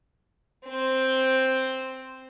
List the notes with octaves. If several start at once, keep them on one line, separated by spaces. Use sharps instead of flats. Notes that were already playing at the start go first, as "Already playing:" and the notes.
C4 C5